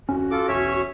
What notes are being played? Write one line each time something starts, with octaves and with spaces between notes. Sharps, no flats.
D1 F2 C#4 F#4
F4 A4 D6
E1 B1 C#4 C#5 E5